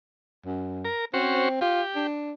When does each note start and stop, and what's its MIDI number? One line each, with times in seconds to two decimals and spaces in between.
0.46 0.89 42
0.85 1.05 70
1.14 1.61 60
1.14 1.49 61
1.14 1.49 66
1.14 1.49 72
1.61 1.82 65
1.61 2.07 67
1.96 2.32 62